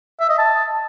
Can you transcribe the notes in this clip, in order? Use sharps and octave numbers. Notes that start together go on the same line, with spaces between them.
E5
D#5
A5